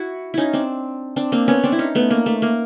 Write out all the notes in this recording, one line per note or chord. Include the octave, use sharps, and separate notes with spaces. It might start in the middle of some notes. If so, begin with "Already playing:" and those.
Already playing: E4 F#4
C#4 D#4 E4
C4 D4
C4 D4
A#3 C4
B3 C#4
C4 D4
E4
C#4 D#4
A3 B3
A#3
A3
A#3